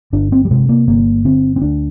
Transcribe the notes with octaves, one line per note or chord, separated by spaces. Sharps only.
G1 D4
C4
G3
C3 G#3
A#3
G1 A#3
D3 C4
C4
D2 D4